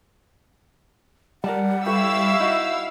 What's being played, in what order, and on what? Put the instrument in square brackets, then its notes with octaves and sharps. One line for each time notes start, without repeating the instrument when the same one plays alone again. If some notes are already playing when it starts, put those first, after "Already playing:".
[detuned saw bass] G3 [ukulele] A#4 D5 A5 [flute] F#5
[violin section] E4 F5 E6 [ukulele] G4 A4 B4 [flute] C#6
[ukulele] D#4 F#4